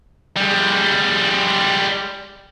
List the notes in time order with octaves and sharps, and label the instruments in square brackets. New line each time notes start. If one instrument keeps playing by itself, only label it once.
[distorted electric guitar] G3 G#3